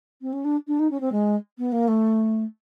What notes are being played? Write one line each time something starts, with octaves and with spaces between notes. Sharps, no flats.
C4
C#4
D4
D4
D#4
C#4
C4
G#3
B3
A#3
A3